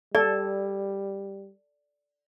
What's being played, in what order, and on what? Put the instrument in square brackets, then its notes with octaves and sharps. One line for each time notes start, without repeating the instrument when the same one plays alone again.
[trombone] G3 [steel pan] A4 [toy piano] D5